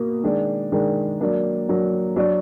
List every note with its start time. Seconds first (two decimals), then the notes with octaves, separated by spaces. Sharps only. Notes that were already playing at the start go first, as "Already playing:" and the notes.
Already playing: B2 A#3
0.23 D#3 G#3 D4
0.72 D#3 G#3 D4
1.21 F#3 A#3 D4
1.69 F#3 A#3 D4
2.16 F#3 D4 F#4 D5